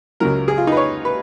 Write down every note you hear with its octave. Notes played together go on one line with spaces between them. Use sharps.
C#2 C#3 F#3 A#4
G#4
F4
D#4 B4
C#5
B4